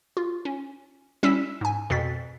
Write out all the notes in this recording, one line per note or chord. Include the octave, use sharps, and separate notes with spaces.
F4
C#4
G3 C#4 E4 E6 B6 E7
G#2 G#5
F2 B2 A6 B6